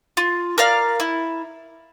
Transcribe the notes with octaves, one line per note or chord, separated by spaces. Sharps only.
F4
A#4 D5 F5
E4